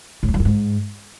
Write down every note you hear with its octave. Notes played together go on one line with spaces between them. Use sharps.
A2
F2
F#2
G2
G#2